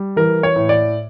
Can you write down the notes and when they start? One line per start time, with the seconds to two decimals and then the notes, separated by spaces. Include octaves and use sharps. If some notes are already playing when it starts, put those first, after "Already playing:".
Already playing: G3
0.16 E3 A#4
0.43 C#5
0.56 A2
0.69 D5